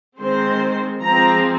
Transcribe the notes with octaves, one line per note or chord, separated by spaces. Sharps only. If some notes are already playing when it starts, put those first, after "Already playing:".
D#3 G#3 C4 C5
F3 G#3 C4 A#5